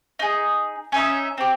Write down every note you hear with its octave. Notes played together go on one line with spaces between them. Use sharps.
D#4 G#4
C#4 D#4 E5
C4 G4